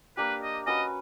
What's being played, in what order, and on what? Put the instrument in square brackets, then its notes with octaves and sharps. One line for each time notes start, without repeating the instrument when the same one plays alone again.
[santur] A#3 D4 G4 [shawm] B4
[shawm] D#5
[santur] C#4 F#4 B4 [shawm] D#5